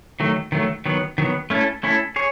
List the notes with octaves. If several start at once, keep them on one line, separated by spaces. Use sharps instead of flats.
D#3 F#3 A3
D#3 F#3 A3
D#3 F#3 B3
D#3 F#3 B3
A3 C#4 E4 A4
A3 C#4 E4 A4
G#4 C#5